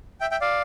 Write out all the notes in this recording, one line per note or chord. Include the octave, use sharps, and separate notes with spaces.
E5 G5
E5 G5
D5 F5